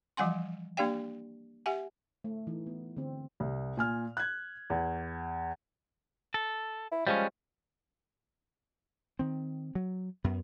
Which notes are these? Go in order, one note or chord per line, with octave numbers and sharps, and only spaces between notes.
E3 F3 G3 F#5 G#5 C6
A#3 D4 G4 D5 F5 G5
G4 E5 F#5 G#5
A3
E3 D#4
B3
D3 C4
C2
A#2 G#5 F6
F#6 G#6
E2
A4
E4
F3 G3 G#3 C#4
D#3 C4
F#3
F#2 B3